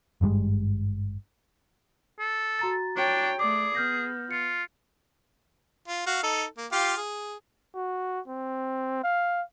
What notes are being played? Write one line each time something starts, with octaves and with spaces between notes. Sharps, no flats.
G#1 G2 G3 G#3
A4
F#4 A#5 A6
D4 C#5 G5
A3 G#4 D5 D6
B3 F6 G6 A#6
F4 C#7
F4
F#4 F5
D#4 A4
A#3
F4 G4 F5
G#4
F#4
C4
F5